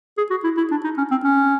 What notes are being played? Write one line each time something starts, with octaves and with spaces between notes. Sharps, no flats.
G#4
F#4
E4
E4
D4
D#4
C#4
C4
C#4